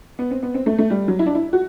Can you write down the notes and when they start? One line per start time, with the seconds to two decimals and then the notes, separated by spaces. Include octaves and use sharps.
0.19 B3
0.31 C4
0.43 B3
0.54 C4
0.66 A3
0.78 A3
0.90 G3
1.08 F#3
1.19 E4
1.26 D4
1.35 E4
1.53 F#4